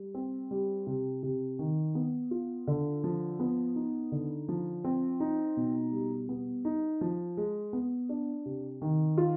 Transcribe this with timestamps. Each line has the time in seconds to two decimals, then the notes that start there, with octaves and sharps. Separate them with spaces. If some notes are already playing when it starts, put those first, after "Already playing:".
Already playing: G3
0.14 C4
0.51 G3
0.87 C3
1.23 C3
1.59 D#3
1.95 B3
2.31 F4
2.67 D3
3.04 F3
3.39 B3
3.76 D#4
4.12 D3
4.48 F3
4.84 C4
5.20 D#4
5.57 B2
5.92 G3
6.29 B3
6.65 D#4
7.01 F3
7.37 G#3
7.73 B3
8.09 D4
8.45 C3
8.82 D#3
9.18 F4